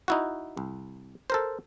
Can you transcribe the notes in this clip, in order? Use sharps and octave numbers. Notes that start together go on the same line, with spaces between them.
D#4 E4 F#4
C2
A4 A#4 C5